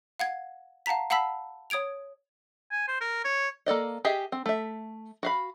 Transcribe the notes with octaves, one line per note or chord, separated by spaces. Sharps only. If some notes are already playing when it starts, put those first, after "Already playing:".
F5 F#5 G#6
F5 F#5 A5 A#5 B6
F5 F#5 A5 B5 E6 B6
C#5 D#6 G#6 D7 F7
G#5
C5
A#4
C#5
A#3 A4 D5 D#5
G4 G#4 D#5 E5 G5
C4
A3 E5
F#4 F5 B5